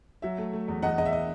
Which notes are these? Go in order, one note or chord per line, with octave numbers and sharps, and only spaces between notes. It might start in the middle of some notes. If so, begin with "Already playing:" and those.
F#3 E5
A3
A3
E2
E2 D#5 F#5
E2 D#5
E5
D#5